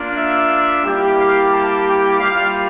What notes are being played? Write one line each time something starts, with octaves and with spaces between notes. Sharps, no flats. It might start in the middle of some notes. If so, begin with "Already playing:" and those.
Already playing: A#3 D4 F4
E5
G3 A#3 E4 G4
F5
A5
G5
G3 A#3 F4 F5